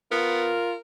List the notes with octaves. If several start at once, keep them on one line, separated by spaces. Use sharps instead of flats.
B3 F4 A#4